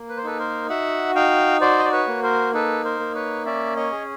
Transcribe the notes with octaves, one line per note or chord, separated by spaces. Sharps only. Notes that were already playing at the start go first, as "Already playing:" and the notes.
Already playing: A#3
B4
C5
D#4 A4 B4
A#4 C5
F#4 E5 F#5
D#4 F5 G5
F#4 C5 D5
D#5
D5
B4 C#5
A#3
A#4 C5
D#4 A4 B4
A#4 C5
A#3
B4 C#5
C#4 D5 E5
C#5 D#5
G#4